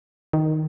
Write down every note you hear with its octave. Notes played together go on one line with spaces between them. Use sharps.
D#3